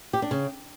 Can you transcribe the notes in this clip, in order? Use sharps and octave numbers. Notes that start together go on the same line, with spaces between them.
G4
D4
C#3